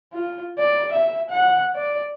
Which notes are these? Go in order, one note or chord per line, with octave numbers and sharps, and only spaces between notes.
F4
D5
E5
F#5
D5